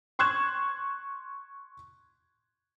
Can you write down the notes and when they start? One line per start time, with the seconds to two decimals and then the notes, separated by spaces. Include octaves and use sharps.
0.19 C6 C#6 F#6 G#6 E7